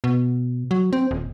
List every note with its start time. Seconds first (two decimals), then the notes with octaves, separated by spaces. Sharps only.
0.04 B2
0.71 F#3
0.93 C4
1.11 D#1